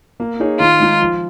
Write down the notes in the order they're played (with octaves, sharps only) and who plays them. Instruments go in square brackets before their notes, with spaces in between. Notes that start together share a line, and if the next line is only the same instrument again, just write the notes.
[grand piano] A#3
D#4 G#4 C#5
[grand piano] D#3 [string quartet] F4
[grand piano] G#3 D#4
F3